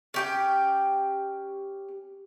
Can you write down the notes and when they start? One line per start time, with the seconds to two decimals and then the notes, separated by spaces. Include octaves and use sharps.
0.14 C#4 G4 G5